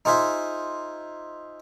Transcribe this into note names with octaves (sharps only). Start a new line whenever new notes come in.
D#4 F4 G#4 C5 E5